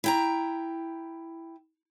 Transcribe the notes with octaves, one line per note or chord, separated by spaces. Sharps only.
E4 G5 A#5